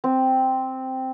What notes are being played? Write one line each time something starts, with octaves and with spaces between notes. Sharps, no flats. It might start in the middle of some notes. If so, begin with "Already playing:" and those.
C4